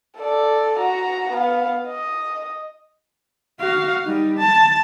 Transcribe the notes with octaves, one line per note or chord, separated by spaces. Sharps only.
A4 D5
F#4 A#5
B3 F5
D#5
F#4 F5
G3 D#4
A5